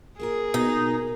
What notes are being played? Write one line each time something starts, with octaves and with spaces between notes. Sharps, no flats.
A#3 F4 G#4 A#4
B2 D#4